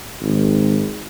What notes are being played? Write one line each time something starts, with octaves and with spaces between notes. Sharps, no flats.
G#1